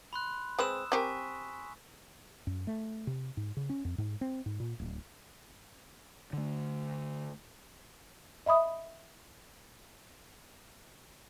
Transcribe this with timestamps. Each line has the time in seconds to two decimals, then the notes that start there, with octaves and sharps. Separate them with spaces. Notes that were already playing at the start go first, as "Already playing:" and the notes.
0.13 B5 C6 F#6
0.59 G#3 C4 B4 D#6 E6 E7
0.92 C4 G4 A#4 G#5 C#6 B6
2.47 F#2
2.67 A3
3.07 C3
3.37 G#2
3.57 C#3
3.70 C#4
3.85 F2
3.98 G#2
4.21 C4
4.46 G#2
4.60 A#2
4.80 D1
6.33 D3 A3
8.46 D#5 E5 B5 D#6